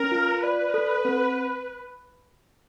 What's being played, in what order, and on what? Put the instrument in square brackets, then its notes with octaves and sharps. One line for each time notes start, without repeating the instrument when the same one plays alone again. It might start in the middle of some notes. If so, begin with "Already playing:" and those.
Already playing: [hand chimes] C#4 [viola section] A#4
[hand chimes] F4
[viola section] B4 [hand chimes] D5
[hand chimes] A4
C4